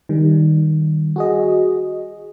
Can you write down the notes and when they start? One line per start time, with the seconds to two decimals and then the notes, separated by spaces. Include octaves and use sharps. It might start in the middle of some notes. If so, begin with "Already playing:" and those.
0.09 D#3 G3
1.16 F#4 G#4 D#5